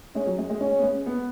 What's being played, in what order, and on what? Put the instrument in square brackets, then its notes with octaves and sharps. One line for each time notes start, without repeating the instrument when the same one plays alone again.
[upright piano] G#3 [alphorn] C#4
[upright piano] F#3
G#3
G#3
[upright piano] G#3 [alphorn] C#4
[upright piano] B3
G#3
B3